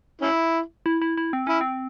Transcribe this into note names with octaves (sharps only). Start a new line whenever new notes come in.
C#4 E4
E4
E4
E4
C4
C#4 E4
C4